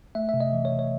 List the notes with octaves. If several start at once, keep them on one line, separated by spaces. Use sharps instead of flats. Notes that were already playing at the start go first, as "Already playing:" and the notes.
A3 E5
C3 E5
D#5
E3
C#5
C3
C#5